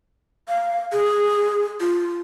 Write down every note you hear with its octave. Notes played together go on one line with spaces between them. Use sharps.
F5
G#4
F4